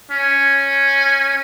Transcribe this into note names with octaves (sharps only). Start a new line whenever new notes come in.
C#4